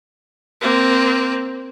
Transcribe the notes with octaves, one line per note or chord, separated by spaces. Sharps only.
A#3 C4